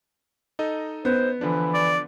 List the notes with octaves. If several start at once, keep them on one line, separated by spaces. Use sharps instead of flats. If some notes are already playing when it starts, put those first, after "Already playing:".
D#4 A4 D#5
B3 C5
D3 E3 F3 D4
D5